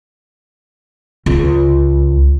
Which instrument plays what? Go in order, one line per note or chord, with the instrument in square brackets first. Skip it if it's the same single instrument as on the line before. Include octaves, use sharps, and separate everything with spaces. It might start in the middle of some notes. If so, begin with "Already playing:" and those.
[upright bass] C#2